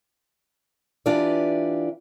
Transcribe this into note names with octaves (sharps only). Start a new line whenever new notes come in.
E3 D4 F4 G4 B4 D5